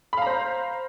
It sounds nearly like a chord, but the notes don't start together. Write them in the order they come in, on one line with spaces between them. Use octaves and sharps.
B5 F5 A#5 C5